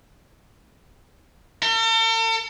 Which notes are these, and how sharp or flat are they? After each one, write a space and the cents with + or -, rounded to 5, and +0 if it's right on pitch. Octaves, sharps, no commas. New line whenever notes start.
A4 +45